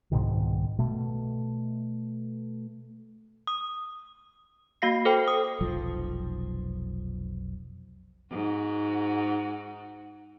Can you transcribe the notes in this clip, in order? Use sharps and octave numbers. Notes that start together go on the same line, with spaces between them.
C2 G#2 B2 D#3
B2 A3
D#6
A#3 F#4 F5 A#6 C7
A4 C5 G5
D#6
F1 B1 F3
G#2 F#4